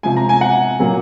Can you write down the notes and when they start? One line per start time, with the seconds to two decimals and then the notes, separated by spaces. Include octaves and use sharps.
0.03 C3 F3 G#3 G#5
0.17 A#5
0.29 G#5
0.41 F#5
0.80 A#2 F#3 A#3